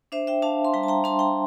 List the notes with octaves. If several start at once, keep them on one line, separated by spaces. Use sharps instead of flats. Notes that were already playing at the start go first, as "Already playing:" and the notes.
D4 C5 E5
E5 G5
D4 F5 A5
C6
G3 G5 A#5
A5
G5 A#5
D4 A5 C6
G5 A#5